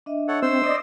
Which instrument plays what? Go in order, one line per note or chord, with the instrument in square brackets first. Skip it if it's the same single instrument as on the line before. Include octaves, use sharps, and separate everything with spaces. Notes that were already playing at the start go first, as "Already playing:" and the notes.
[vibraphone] D4 D#5 E5
[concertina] A4 C#5 F#5
[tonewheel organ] C4 [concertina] C5 E6
[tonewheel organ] D5 D#5